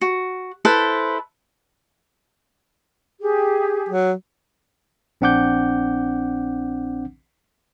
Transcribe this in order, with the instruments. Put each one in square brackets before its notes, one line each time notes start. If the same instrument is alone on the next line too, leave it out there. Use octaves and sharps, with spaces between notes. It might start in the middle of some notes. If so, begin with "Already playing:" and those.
[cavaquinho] F#4
E4 A4 B4 C5
[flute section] G4 G#4
[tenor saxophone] F#3
[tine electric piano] A#1 C4 D4 F#5 D6 G6